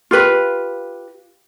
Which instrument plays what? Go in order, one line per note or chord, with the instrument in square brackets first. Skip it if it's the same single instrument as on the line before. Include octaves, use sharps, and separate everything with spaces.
[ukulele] F4 G4 B4